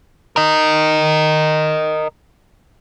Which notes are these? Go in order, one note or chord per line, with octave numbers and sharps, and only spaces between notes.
A#4 D#5